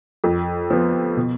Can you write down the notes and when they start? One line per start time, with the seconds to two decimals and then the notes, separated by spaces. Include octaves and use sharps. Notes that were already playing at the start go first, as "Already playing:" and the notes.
0.24 F2
0.70 F3 B3
1.17 B2